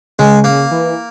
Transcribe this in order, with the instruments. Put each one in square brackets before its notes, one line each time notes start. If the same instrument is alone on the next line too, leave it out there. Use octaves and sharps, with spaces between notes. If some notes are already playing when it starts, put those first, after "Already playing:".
[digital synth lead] C#3 [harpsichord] G#3
[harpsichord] A#3
[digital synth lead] E3